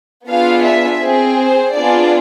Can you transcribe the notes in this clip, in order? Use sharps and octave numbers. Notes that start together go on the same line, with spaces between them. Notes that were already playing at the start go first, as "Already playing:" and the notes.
B3 D4 F4 G#4 F5
E5
C4 G#4
C5
B3 D4 F4 G#4 D5